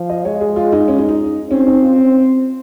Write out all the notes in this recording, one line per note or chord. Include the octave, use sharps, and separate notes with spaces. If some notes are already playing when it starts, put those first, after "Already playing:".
Already playing: F3
D#5
G#3 C#5
G#4
F4
D#4
C#4
D#4
D#4
C4 C#4
D#4
F4
C#4